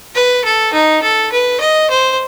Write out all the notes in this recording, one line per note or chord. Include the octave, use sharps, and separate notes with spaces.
B4
A4
D#4
A4
B4
D#5
C5